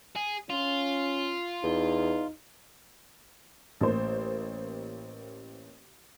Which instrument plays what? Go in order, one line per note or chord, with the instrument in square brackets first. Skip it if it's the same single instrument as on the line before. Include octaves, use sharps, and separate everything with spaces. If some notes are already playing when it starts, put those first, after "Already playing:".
[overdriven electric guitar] G#4
[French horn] C#4 [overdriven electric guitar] F4
[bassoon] E2 [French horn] D#4
[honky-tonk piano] A1 A#3 C5